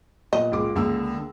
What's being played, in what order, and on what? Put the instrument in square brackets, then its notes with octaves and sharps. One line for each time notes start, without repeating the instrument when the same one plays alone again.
[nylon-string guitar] A#2 B3 [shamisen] D#5
[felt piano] C#2 F4 D6
[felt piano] C#2 E6 [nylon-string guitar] D3 A#3